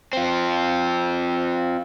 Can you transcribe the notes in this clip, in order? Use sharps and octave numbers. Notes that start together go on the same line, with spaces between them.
C4 F4